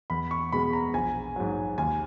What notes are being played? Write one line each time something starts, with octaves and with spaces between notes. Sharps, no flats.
E2 B5
C#6
B2 G#3 B3 B5
A#5
A#1 G#5
G#2 F#3
D#2 G#5